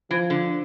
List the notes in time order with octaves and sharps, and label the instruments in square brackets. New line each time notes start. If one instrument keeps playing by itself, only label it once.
[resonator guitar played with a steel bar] E3 [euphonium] F3
[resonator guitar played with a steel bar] D3